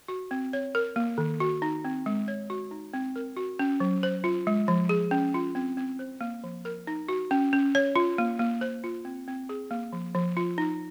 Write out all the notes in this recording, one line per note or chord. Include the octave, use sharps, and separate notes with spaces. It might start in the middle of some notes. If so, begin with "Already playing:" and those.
F#4
C4
C#5
A#4
A#3
D#3
F#4
D#4
C4
G#3
C#5
F#4
D#4
C4
A#4
F#4
C#4
F#3
C5
F4
G#3
F3
G#4
C#4
F4
C4
C4
C5
A#3
F3
A#4
D#4
F#4
C#4
C#4
C#5
F4
A#3
A#3
C5
F4
C4
C4
G#4
A#3
F3
F3
F4
D#4